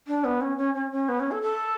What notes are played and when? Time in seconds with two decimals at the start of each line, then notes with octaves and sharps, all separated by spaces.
0.08 D4
0.24 B3
0.41 C#4
0.58 C#4
0.75 C#4
0.92 C#4
1.09 B3
1.20 C#4
1.31 A4
1.42 A4